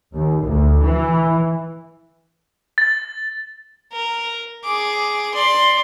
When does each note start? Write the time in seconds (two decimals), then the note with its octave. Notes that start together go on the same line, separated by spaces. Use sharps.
0.15 D#2
0.45 D2
0.85 E3
2.78 A6
3.93 A#4
4.64 G#4 D6
5.34 D5 C6